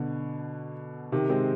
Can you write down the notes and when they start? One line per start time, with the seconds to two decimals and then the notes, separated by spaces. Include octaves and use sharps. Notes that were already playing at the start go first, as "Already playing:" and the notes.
Already playing: B2 D3
1.12 C3 D#3
1.30 G#3 C4